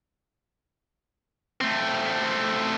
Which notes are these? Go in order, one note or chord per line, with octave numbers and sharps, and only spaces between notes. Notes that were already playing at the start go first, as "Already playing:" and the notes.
A3 C4